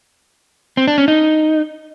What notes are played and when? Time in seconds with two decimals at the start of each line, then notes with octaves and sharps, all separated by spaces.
0.77 C4
0.88 D4
0.98 C#4
1.08 D#4